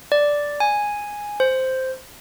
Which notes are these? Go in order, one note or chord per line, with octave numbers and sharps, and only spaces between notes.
D5
G#5
C5